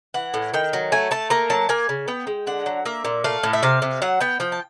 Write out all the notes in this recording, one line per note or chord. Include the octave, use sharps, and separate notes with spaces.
E3 F#5
A2
D#3 G5
F#3
A3 G#5
A3 A5
A#3 A#5
F#3 A5
A#3 G#5
C#3
B3 G5
G#3
D3 F#5
F#3
A#3 E5
A#2
A3 F5
A2
E5
C3 F5
C3
F#3 F#5
B3 G5
F3 G5
A5